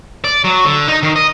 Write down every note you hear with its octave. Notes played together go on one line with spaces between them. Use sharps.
D5
F#3
D3
D#4
D#3
D#5